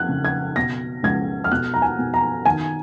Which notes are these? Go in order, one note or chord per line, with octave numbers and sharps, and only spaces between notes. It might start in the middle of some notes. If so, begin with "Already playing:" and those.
Already playing: F2 F#6 G#6
C#3
G#6
B2 A#6
C#2 G#6
F6
B2 F#6
A#5
G#5
B2
A#5
D#3 G#5